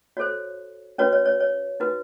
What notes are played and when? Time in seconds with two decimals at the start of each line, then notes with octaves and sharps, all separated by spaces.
0.17 F#4 A4 C5 C#5
0.98 C#4 F#4 B4 C#5
1.13 C#5
1.26 C#5
1.40 C#5
1.80 D#4 F#4 B4